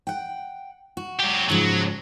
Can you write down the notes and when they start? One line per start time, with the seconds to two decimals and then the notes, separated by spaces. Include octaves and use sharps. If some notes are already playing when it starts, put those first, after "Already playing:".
0.07 F#5 G5
0.97 F#4
1.20 F#3 G4
1.50 G#2 C#3 F3 F#3